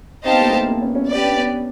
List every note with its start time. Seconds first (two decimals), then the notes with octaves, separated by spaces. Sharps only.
0.24 C4 D#4 G4 C5 F5 A5
0.32 B3
0.41 A#3
0.50 A3 B3
0.67 A#3 C4
0.81 B3 C#4
0.95 B3 C#4
1.09 C#4 G4 B4 D5
1.23 D4
1.36 B3 C#4